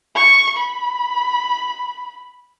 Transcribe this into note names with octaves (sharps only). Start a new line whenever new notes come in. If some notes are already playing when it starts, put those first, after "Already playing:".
C#6
B5